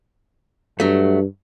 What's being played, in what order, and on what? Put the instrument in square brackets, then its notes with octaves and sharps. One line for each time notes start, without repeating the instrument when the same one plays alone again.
[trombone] G2 [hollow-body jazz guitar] F#3 A3